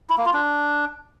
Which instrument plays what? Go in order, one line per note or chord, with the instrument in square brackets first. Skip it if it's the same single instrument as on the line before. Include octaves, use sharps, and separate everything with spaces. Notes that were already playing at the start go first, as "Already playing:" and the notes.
[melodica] E4
A#3
F4
D4